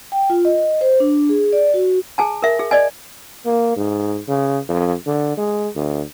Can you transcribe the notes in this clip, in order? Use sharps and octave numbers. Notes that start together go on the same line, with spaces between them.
G5
F4
D#5
C5
D4
G#4
D5
F#4
G#4 G#5 A5
A#4 E5
G#4
D5 D#5 G#5
A#3
G#2
C#3
F2
D3
G#3
D2